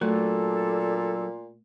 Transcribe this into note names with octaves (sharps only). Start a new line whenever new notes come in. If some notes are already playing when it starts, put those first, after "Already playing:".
A#2 F#3 A3 D4 A4